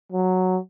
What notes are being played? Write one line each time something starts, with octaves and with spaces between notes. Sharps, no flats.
F#3